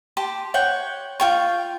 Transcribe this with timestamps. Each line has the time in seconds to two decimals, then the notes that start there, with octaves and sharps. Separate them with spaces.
0.17 G4 A5 C6
0.54 C#5 F#5 G5
1.20 F4 G5 C#6